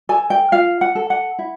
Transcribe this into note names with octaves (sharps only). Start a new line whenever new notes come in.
A4 G#5
G5
F4 F5
F#5
A4
F#5
E4